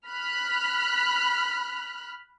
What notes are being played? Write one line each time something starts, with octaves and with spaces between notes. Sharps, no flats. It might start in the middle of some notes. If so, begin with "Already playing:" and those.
B5 F6 F#6